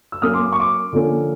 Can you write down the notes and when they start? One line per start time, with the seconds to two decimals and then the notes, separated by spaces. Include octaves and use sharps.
0.12 E6
0.22 F#3 A#3 C#4 D#6 F6
0.34 C6 D6
0.46 D6
0.53 C#6
0.60 C6 D6
0.93 D3 F3 A#3 C#4